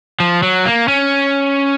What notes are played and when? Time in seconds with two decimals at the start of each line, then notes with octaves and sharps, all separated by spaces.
0.20 F3
0.43 F#3
0.66 A#3
0.88 C#4